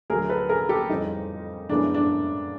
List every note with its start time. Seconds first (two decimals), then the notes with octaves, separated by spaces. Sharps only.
0.10 D2 D3 F#3 G#4 A#4
0.29 A4 B4
0.49 G#4 A#4
0.69 G4 A4
0.89 F2 C#3 E3 G3 D#4
1.69 F#2 C#3 E3 G#3 B3 D4
1.94 D4